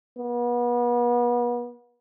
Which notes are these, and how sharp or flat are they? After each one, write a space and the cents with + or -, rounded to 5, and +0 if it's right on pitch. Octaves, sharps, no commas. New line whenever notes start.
B3 -35